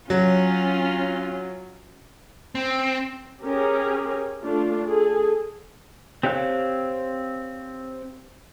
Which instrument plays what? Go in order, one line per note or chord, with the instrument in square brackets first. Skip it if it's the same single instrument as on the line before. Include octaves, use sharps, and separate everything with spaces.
[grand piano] F#3 [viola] C#4 F4
[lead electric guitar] C4
[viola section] C#4 G4 G#4 A#4
A3 D4 F4
G#4 A4
[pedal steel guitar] C4 G4 C#5 F5 F#6